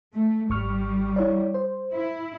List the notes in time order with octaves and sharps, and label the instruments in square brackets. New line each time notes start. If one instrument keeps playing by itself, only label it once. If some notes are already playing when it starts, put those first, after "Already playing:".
[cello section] A3
[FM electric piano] G#1 C#6 F6 [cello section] G3
[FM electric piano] E4 C#5 D5
C5
[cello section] E4